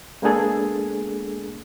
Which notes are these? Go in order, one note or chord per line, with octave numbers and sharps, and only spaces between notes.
G#3 A#3 B3 D4 G#4 A4